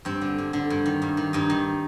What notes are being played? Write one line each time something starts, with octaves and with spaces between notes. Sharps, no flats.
G2 C4
D3
G2
D3
G2
D#3
G2
D#3
G2 D#4
D#3